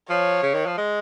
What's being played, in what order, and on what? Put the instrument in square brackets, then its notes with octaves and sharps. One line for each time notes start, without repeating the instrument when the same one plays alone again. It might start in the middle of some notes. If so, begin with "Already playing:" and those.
[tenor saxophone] F3 [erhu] C#5
[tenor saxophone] C#3
D#3
F3
G#3